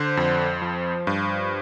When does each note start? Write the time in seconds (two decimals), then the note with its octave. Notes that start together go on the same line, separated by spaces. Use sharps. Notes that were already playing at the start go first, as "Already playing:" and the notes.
Already playing: D3 C5
0.17 F2
0.62 F3
1.07 G2